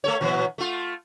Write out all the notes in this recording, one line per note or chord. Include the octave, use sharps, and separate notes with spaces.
A3 A4 C#5
A#2 E3 F#3
A3 F4